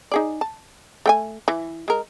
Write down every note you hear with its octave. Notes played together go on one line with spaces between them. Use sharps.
D#4 G#4 D5
A5
A3 G5 G#5
E3
G#3 A#4